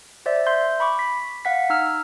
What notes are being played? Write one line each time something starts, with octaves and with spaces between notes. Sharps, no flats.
C5 D5 E5
E5 C6 G6
B5 C#6 D6
B6
F5 F#5 B6
D#4 E6 F6